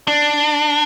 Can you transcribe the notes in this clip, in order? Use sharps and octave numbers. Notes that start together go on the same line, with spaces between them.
D4